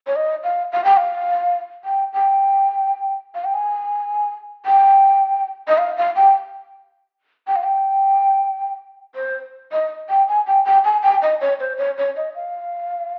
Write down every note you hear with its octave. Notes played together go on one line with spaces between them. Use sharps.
C#5
D#5
F5
F5
G5
F5
G5
G5
F5
G5
G#5
G5
D#5
F5
F5
G5
G5
F5
G5
C5
D#5
G5
G#5
G5
G5
G#5
G5
D#5
C#5
C5
C#5
C#5
D#5
F5